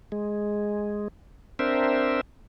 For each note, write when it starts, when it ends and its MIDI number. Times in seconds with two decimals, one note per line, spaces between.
0.12 1.08 56
1.59 2.21 60
1.59 2.21 62
1.59 2.21 70
1.59 2.21 72
1.59 2.21 76